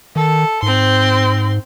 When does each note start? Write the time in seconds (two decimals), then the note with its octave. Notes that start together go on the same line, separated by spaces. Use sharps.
0.16 D#3 A4
0.62 G#2 C4 C6